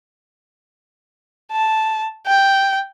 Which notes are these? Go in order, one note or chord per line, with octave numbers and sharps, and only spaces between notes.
A5
G5